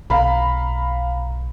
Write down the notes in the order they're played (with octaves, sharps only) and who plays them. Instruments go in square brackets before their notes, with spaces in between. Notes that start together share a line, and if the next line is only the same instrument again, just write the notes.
[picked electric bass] B1 [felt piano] F5 A#5 B5